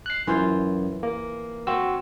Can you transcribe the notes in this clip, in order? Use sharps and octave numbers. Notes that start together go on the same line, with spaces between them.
F#6 C7
F#2 E3 F4 C5
A#3
C4 F#4 E6